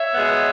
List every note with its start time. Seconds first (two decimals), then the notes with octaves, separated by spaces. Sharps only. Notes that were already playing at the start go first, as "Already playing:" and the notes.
Already playing: C#5 E5
0.14 B2 G#3 B3